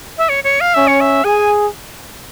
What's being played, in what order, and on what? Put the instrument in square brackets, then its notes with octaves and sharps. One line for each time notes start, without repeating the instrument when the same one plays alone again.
[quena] E5
C#5
C#5
F5
[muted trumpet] C#4 [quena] E5
[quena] C#5
E5
[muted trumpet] G#4 [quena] G#5